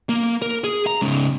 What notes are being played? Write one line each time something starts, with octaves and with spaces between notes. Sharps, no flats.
A#3
A#4
G#4
A#5
G#2 C#3